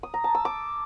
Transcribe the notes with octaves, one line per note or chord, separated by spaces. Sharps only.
D#6
A#5
A5
E6
D6